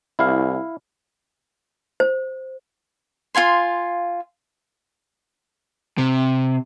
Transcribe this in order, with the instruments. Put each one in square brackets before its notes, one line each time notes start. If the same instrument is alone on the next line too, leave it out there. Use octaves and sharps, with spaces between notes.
[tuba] C2 [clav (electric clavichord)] E4 F5
[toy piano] C5
[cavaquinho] F4 F5 G#5 C6
[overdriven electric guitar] C3